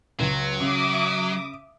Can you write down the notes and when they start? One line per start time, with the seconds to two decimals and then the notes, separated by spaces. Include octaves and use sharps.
0.20 C#2 F#3
0.61 C#3 E5 D6 D#6